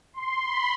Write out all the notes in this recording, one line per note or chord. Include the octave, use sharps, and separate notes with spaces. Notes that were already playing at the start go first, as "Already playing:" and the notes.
C6
B5